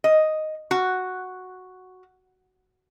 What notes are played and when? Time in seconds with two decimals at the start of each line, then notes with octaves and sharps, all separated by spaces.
0.04 D#5
0.71 F#4